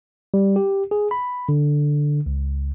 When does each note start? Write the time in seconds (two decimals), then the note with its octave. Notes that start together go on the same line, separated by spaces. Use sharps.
0.34 G3
0.56 G4
0.91 G#4
1.11 B5
1.49 D3
2.26 C#2